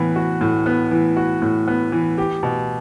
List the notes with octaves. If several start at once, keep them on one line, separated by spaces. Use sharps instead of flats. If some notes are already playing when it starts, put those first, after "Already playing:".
Already playing: A2 E3 B3
F#4
A2
B3
E3
F#4
A2
B3
E3
G4
B2